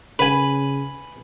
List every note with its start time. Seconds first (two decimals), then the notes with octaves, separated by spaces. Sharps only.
0.19 C#3 B4 G#5